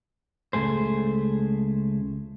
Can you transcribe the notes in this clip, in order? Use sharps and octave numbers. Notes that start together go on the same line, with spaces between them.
C#2 B2 A3 G#4 C5